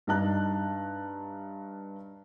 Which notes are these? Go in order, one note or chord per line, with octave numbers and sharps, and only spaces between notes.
G2 D4 D#4 A5 A#5 F#6